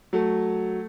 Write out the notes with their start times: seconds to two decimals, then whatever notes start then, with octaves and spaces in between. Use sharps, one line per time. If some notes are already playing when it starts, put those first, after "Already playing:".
0.13 F#3 A3